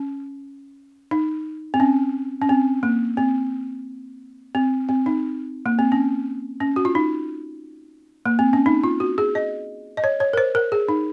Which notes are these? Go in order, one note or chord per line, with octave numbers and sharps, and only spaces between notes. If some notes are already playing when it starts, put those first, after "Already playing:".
Already playing: C#4
D#4
C4
C#4
C#4
C4
A#3
C4
C4
C4
D#4
A#3
C4
C#4
C#4
F#4
F4
D#4
A#3
C4
C#4
D#4
F4
F#4
G#4
D#5
D#5
C#5
C#5
A#4
C5
A#4
G#4
D#4